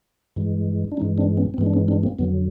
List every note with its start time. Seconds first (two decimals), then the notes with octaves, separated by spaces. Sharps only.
0.36 G2 E3 G#3
0.92 D4
0.97 G2 E3 G#3 C#4 D#4
1.18 C4 D4
1.37 B3 C#4
1.54 C4
1.58 G2 E3 G#3 B3
1.66 D4
1.73 B3 C#4
1.88 C4 D4
2.03 A#3 C4
2.19 F2 D3 F#3 B3